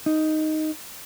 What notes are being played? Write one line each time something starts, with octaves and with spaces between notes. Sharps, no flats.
D#4